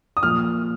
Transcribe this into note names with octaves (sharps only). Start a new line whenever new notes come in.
D#6
A#2 F3 F6